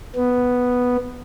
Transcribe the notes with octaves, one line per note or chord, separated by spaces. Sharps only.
B3